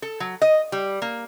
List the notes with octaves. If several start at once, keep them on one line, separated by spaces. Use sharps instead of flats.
A4
F#3
D#5
G3
A#3